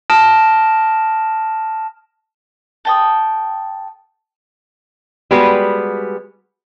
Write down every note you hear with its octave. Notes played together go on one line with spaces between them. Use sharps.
A5 D#6 F6 A#6 D7 E7
A4 G5 D#6
G3 G#3 B3 F#4 B4